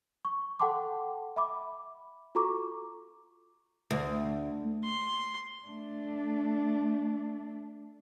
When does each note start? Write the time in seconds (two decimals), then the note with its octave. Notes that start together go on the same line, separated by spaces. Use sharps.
0.25 C#6
0.60 A4 F#5 G5 A5 C6 D6
1.36 E5 B5 D6
2.35 F4 F#4 A4 A#5 C#6 D6
3.91 D2
4.83 C6
5.67 A3 D4